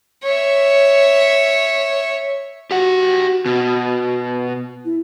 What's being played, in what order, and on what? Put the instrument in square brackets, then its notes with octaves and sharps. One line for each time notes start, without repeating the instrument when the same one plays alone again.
[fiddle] C#5 E5
[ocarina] F#4 [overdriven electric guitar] G4 F#5
[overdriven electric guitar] B2
[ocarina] E4